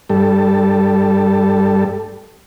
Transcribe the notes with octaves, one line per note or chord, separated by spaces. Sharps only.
G2 G3 A4